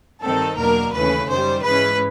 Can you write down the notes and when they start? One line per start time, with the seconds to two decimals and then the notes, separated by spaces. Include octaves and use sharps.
0.22 G2 D#3 G3 C4 D#4 A4
0.57 E2 B2 F#3 A#3 D4 A#4
0.92 D#2 C#3 E3 A3 C#4 B4
1.28 F#2 D#3 G3 C5
1.63 G#2 E3 G#3 C#4 B4